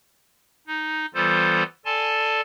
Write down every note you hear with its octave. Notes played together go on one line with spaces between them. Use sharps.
D#4
E3 G3 B3 F4 A4 C5
A4 D5 G#5 A5 C6